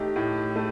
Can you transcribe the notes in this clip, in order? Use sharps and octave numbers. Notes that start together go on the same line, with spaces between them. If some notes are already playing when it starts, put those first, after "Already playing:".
Already playing: A2 A3 D#4 G4
A2
A3